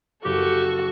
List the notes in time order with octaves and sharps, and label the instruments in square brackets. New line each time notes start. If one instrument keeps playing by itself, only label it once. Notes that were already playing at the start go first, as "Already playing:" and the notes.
[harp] F#1 B3 [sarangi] F#4 [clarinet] G4 [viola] A4 C#6